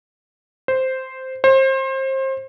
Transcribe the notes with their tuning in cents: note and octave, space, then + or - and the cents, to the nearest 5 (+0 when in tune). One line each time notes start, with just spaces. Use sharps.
C5 -5
C5 +30